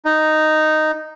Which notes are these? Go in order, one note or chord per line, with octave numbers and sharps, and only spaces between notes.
D#4